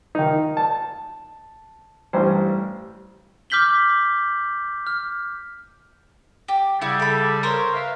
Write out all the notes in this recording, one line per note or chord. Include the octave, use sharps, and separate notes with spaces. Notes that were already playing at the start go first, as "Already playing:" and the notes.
D#3 D#4
A5
A1 G2 C5
D6 F6 G6 B6 F#7 G7
F6
G4
C#3 G3 E4 F#4
A4 B5
A#4 C5 C#5
B4 E5 F5